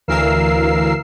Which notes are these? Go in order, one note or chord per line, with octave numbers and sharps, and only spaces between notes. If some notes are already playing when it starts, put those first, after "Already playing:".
D2 E3 A#4 F5 E6 C7